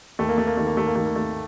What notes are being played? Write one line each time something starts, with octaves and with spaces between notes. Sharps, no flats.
D#2 A3
A#3
A3
A#3
D#3 A3
A#3
A3
A#3
D#3 A3
A#3
A3